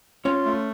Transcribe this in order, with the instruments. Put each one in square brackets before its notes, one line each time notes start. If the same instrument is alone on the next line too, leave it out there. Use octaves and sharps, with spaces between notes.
[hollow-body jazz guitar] C#4 C#5 [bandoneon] F4
[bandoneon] A3